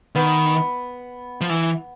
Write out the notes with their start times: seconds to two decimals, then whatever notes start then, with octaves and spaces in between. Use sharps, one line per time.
0.15 D#3 B3
1.41 F3
1.50 E3